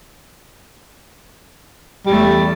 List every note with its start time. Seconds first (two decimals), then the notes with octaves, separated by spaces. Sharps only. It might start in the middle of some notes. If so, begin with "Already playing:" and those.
2.06 E2 G3 A3